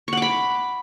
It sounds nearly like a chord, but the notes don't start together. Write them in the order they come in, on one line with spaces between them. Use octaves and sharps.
C#6 F#5 D6 B5